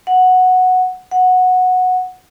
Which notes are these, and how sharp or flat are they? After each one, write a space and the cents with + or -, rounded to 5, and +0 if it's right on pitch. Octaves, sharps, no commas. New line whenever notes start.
F#5 -5
F#5 -10